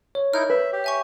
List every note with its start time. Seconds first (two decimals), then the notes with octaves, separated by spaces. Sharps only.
0.15 C#5
0.33 D#4 E4 A#4 F6 G6
0.50 B4 E5
0.73 G4
0.84 E5 G#5 C#6